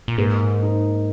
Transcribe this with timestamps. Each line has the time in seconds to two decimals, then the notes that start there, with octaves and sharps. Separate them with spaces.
0.08 A#2
0.18 G#2 A#3
0.63 D#4